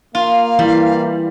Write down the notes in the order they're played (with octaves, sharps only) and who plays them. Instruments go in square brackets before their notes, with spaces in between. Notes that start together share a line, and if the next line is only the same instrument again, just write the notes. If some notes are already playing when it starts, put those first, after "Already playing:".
[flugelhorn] A#3 [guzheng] F4 [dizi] F5
[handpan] E3 [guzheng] G3